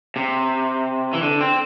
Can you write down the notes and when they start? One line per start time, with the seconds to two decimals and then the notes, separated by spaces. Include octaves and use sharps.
0.16 C3
1.13 E3
1.23 D3
1.41 C4